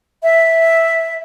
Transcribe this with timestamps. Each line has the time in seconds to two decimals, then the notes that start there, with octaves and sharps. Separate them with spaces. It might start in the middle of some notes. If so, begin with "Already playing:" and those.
0.23 E5